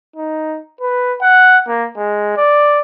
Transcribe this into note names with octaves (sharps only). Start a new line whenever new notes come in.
D#4
B4
F#5
A#3
G#3
D5